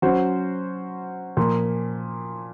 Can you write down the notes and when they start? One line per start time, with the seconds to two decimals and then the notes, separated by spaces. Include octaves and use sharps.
0.02 F#3 C#4 F#4 C5
1.37 A#2 F3 A#3